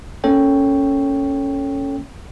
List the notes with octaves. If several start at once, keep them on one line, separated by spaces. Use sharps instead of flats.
A#3 C#4 A4 C#5 G5